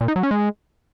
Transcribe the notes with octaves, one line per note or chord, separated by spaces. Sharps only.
A#2
D#4
F#3
C#4
G#3